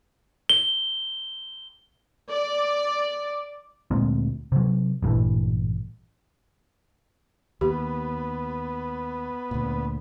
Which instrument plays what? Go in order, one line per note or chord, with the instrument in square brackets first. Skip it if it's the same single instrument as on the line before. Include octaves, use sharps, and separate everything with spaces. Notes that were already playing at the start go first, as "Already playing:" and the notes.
[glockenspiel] G7
[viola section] D5
[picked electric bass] D2 A#2 G#3 C4
C3 F#3
A1 G2 A#2 E3
[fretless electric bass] D#2 [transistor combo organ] B3 [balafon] G4
[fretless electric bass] D2 A#2